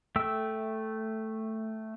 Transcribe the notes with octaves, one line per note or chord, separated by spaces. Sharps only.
A3 E5 G5 E6